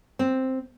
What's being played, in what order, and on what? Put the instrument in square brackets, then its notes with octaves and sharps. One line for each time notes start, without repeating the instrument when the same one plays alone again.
[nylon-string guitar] C4